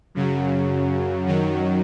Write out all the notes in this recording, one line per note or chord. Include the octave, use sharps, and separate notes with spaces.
F#2 C#3 F#3
F#2 D#3 F#3